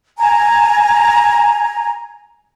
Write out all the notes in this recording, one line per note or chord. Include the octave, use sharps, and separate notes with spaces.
G#5 A#5